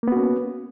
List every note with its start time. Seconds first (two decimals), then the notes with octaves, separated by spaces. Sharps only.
0.03 A#3
0.08 B3
0.12 F#4
0.17 C#4